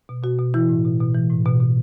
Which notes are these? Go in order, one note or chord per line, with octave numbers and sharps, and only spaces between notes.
B2
B2 F#4
B2
E3 E4
A2
B2
B2
E3
A2
B2
B2